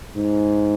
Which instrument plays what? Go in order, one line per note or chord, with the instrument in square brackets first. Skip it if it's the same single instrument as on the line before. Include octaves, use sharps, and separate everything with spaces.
[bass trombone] G#2